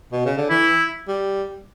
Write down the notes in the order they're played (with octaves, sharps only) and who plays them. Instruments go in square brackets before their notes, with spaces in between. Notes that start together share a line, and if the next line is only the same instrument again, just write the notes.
[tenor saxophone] B2
C#3
D3
[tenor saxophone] E3 [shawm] E4
[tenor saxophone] G3